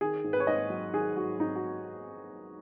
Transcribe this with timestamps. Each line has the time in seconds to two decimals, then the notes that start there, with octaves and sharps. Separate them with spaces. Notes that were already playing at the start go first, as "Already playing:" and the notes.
0.01 D#3 G#4
0.24 G#2
0.33 B4
0.40 C#5
0.47 G#2 D#5
0.70 F#3
0.93 D#3 G#4
1.16 G#2 F#4
1.39 G#2 D#4
1.56 F#4